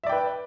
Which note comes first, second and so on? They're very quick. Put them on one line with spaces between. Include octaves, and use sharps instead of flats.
E5 D5 G5 B4